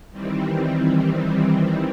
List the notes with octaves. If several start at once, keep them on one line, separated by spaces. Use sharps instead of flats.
D#3 E3 G3 C4